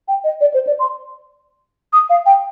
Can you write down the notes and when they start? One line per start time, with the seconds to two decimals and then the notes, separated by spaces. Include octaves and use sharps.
0.08 G5
0.24 D#5
0.41 D5
0.54 C5
0.67 D5
0.79 C6
1.93 D#6
2.10 F5
2.26 G5